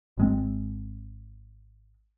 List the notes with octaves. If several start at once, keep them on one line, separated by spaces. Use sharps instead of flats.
G#1 G#3 C4